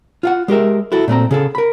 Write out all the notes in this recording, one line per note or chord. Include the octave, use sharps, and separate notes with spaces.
F4 F5 F#5
G#3 G4 A#4 E5
E4 F#4 A4
A#2 A3 C4 A#5
C#3 G#4 A4
A#4 B5